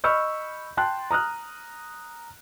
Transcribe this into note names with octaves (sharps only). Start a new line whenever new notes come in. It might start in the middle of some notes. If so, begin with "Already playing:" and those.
D#5 B5 C#6 E6 F6 G6
G5 A5 C6 F#6
A#5 D#6 F6 F#6